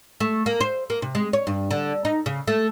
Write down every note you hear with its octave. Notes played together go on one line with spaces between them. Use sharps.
A3
A#3
C5
A#3
C3
G#3
C#5
G2
D3
D#4
C#3
A3